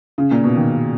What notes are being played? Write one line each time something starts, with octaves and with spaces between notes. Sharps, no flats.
C#3
A#2
B2
D#3